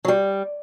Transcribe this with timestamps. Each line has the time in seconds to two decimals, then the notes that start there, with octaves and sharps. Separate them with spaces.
0.05 F#3
0.08 G3